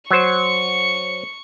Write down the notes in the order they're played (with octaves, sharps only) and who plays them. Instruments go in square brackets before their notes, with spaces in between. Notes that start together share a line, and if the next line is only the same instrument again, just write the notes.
[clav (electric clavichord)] F#3 C5 [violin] C#6 C#7